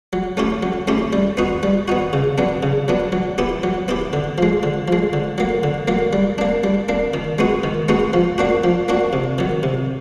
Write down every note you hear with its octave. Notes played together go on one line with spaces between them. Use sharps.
F#3
A3 C#4 E4 G4
F#3
A3 C#4 E4 G4
G3
B3 D#4 F#4
G3
B3 D#4 F#4
C#3
F#3 B3 D4
C#3
F#3 B3 D4
F#3
B3 E4 G4
F#3
B3 E4 G4
D3
F3 G#3
D3
F3 G#3
D3
F#3 A#3
D3
F#3 A#3
G3
A#3 D4
G3
A#3 D4
D#3
G#3 B3 D#4 F#4
D#3
G#3 B3 D#4 F#4
F3
A#3 D4 F#4
F3
A#3 D4 F#4
C3
D#3 F#3
C3